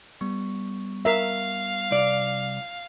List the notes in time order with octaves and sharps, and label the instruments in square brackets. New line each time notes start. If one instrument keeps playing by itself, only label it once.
[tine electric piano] G3 B3 C#6
[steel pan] A#4 E5 [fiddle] F5
[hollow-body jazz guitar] C2 D5